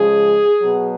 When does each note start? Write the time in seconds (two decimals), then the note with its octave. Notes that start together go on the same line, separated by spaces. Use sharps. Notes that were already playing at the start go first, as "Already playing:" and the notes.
Already playing: C#3 F3 G#3 G#4
0.61 B2 F#3